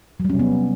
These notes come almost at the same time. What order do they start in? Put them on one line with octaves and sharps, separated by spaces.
F#3 G3 C#4 C3 B3